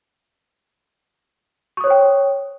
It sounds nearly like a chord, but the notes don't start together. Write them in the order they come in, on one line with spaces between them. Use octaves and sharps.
C#6 D#6 C#5 C5 G5